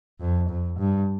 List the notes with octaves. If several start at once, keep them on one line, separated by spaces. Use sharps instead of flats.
F2
F2
G2